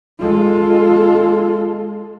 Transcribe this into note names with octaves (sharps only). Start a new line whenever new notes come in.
G#3 F4 A4